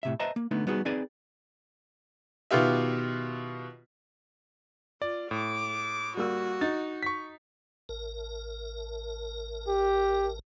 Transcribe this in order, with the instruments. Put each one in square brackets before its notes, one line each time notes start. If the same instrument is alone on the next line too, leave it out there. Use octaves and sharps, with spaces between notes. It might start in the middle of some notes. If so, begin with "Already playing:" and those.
[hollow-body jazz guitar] A2 C3 E5
B4 C5 D#5 E5 A5 A#5
A#3
D3 A3 B3 D#4
G3 B3 D#4 F#4 G#4
C4 D#4 G#4 B4 D5 G#5
[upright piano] B2 D#3 B3 F4 G4 E5
[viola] F4 [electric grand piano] D5
[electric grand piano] A2 [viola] D6
[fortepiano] G3 A#3 E6 [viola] F#4
[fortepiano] D#4 [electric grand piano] A6
[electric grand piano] C#6 B6
[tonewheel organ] A1 A#4
[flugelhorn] G4